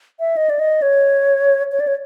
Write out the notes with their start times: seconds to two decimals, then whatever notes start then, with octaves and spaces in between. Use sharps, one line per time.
0.20 E5
0.37 D#5
0.50 D5
0.59 D#5
0.82 C#5
1.72 C#5
1.80 D5
1.87 C#5